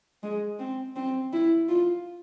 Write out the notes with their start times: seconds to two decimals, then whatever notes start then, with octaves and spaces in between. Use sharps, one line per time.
0.23 G#3
0.59 C4
0.96 C4
1.33 E4
1.69 F4